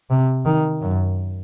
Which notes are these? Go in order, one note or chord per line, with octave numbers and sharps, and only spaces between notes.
C3
D#3
F#2